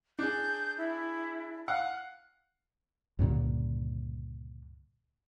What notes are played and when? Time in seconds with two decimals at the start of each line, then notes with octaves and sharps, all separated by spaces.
0.19 D4 G#4 G6
0.78 E4
1.68 F5 F#5 F#6
3.19 C#2 G2 A#2 D3